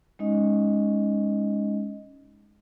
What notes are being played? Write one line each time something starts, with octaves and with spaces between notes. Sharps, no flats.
G#3 C#4 D#4 D#5